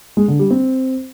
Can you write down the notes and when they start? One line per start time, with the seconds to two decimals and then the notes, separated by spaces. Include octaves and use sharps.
0.17 G#3
0.28 D3
0.39 G3
0.51 C4